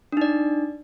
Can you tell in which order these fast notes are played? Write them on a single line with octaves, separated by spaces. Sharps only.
D4 D#4 D5